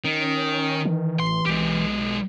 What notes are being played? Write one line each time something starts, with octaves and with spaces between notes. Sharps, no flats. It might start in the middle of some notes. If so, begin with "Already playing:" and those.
D#3 C#4
D#3 E3
A1 C6
B1 G#3 G4